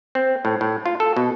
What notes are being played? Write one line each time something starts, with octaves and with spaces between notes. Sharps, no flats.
C4
A2
A2
F4
A4
B2